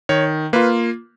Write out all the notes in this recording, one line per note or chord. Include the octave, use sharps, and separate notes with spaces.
D#3 C#5
A#3 F4 B4